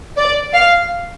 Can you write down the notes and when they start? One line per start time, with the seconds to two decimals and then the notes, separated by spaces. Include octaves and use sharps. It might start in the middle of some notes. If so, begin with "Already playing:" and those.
0.17 D5
0.53 F5